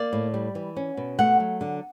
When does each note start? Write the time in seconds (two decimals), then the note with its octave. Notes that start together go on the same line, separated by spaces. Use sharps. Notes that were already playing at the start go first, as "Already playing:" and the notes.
Already playing: A#3 D5
0.13 A2
0.34 G3
0.55 E3
0.76 C#4
0.97 B2
1.19 A3 F#5
1.40 F#3
1.61 D3